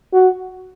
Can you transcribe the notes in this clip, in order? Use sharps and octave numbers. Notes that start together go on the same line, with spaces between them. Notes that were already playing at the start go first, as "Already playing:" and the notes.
F#4